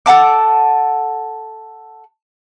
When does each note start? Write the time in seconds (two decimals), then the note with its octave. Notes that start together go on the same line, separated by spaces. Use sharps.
0.06 A4 F#5 A5 D6